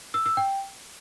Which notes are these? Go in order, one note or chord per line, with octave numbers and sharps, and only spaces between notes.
E6
E6
G5